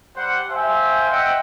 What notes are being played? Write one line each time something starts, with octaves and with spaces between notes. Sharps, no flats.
G3 C5 F#5
C5 E5 F5 G5 G#5
D#5 E5 F#5 G5